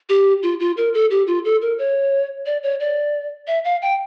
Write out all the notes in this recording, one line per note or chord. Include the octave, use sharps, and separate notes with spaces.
G4
F4
F4
A#4
A4
G4
F4
A4
A#4
C#5
D5
C#5
D5
E5
F5
G5